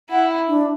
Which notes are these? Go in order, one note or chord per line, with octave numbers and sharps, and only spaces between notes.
E4 F#5
D4